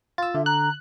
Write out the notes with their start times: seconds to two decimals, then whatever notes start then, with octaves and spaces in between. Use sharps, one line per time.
0.18 F4 E6 A6
0.35 D3 E5
0.46 A#5 F#6